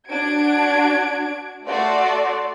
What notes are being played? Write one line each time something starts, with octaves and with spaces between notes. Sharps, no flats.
D4 F#4 G#6 D7
A3 F#4 D5 C6